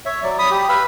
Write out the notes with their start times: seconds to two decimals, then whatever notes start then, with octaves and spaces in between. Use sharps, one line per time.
0.06 C#5 E5
0.23 F#3 D5
0.39 B5 D#6
0.51 G4
0.69 B4 F5 B5 E6